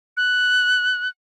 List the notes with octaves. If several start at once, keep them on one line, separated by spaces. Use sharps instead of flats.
F#6